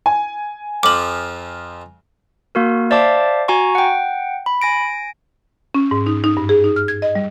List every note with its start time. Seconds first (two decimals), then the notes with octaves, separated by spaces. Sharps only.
0.06 G#5
0.83 F2 F3 D6 F#7
2.55 A#3 F#4 A#4
2.91 C5 D5 E5 F5 A5 D6
3.48 F#4 G#5 A#5 C#6
3.75 F#5 G5
4.46 B5
4.61 G#5 A#6 D7
5.75 C#4
5.91 G#2
6.06 D#4
6.24 D#4
6.37 G2
6.49 G#4
6.64 D#4
6.76 F6
6.88 G#6
7.02 D#5
7.15 G3